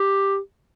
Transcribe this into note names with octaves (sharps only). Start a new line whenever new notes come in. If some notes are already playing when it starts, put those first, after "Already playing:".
Already playing: G4